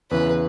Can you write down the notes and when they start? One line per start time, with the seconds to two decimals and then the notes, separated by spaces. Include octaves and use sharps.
0.11 E2 C#3 E3 B4